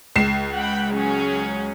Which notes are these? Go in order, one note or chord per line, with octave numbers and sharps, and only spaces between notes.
C#2 C7 E7
F#5 G5 B5
F#3 C#4 G#4